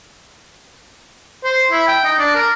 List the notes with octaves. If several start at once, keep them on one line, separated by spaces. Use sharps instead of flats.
C5
E4
G5
D#4
D4
A#4